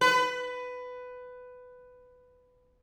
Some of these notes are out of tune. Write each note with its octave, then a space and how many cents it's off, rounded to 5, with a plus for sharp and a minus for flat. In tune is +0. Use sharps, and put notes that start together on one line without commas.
B4 +15